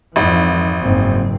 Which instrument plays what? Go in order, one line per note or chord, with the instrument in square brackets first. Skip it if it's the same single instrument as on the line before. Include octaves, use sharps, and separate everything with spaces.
[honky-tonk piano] G#1 [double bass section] F2 E3
[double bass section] F#1 G#2 C4